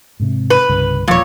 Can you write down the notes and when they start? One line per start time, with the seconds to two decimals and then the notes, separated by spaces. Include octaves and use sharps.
0.20 G#2 C3
0.50 B4
0.69 C2 G2 C#3
1.08 E1 A#2 F3 G3 C#5